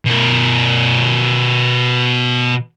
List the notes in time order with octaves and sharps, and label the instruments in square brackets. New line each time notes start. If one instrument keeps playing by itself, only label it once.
[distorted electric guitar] B2 A#4